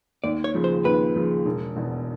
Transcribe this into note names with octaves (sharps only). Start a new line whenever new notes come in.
D#2 D5
C#5
C#3 F3
C5
D#2 B4
C#3 F3
E1
E2 B2